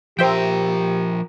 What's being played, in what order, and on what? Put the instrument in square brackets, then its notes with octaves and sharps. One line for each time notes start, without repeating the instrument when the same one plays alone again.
[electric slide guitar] F3 A#4 [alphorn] G4 [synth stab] C5 E5 G5